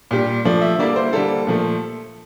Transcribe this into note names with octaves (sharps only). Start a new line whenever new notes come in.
A#2 G3 D4 G4
G2 F3 A3 D5
E5
D3 G3 A#3 E4 D5
C5
D3 G3 A#3 A4
A#2 F3 A3